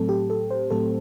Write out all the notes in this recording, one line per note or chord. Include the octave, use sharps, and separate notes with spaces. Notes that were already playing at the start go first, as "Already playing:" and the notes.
Already playing: A2 F#3 A3 C4 A4
G4
A4
C5
A2 F#3 A3 C4 A4